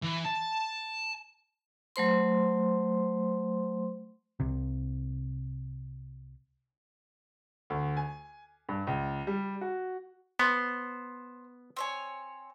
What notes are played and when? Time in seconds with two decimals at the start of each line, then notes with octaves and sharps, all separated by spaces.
0.04 E3
0.26 A5
1.96 F#3 A3 C5 C6
4.40 C2 C3
7.70 D2
7.97 G#5
8.69 G2
8.87 C#2
9.27 G3
9.61 F#4
10.39 B3 C5
11.76 C4 C#5 G#5